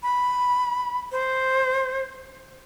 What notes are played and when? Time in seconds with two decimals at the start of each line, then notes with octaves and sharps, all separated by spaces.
0.03 B5
1.12 C5